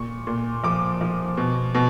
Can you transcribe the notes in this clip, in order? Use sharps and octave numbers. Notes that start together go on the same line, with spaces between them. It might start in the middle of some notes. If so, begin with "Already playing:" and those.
Already playing: A#2 C#6
A#2
F3 D6
F3
B2
B2